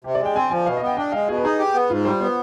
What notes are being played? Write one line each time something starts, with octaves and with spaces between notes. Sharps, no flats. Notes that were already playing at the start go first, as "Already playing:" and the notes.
C3 G4
D5
G#3
G5
C4 G#5
F3 G#5
B2 F5
D#5
B3
G5
D4 G5
G#3 F5
B2 G#4
B4
D#4 G#4
G4
B3
G#2 F4
G3 C5
B3 C5